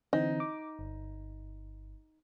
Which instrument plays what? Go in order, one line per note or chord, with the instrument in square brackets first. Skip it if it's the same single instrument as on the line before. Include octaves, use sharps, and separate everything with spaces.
[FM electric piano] D3 E3 C4 [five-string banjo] D#4
[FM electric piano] D6
G1